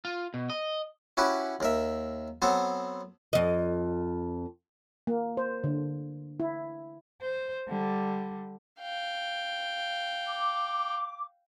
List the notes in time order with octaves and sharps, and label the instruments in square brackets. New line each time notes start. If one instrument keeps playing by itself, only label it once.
[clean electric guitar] F4
B2
D#5
[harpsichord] C#4 E4 F#4 G4 B4
D#2 A#4 E5
F#3 B3 C4 A4
[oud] F2 D#5
[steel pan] A#3
C5
D3
E4
[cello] C5
D3 G3
[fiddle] F5 G5
[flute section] D6